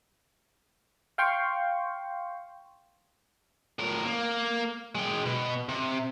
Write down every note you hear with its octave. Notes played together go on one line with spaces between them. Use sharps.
F5 G5 C6 C#6
A2 A#4
A#3
G#3 G5
B2
C3